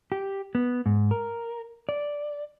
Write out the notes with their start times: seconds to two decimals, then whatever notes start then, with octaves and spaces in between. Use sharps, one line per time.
0.12 G4
0.55 B3
0.86 G#2
1.11 A#4
1.89 D5